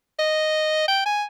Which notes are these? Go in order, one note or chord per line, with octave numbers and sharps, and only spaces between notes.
D#5
G5
G#5